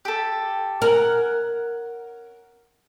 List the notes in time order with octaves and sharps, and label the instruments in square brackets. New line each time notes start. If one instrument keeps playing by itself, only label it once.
[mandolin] G4 A4
[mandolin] C#4 F#5 [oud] A#4